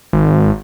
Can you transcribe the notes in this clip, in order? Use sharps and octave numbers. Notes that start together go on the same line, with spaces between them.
G#1